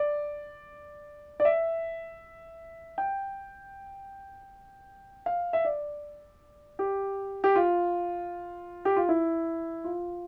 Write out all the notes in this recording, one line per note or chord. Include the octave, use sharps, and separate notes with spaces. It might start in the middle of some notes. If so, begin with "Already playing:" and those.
Already playing: D5
D5
E5
G5
F5
E5
D5
G4
G4
F4
G4
F4
E4
F4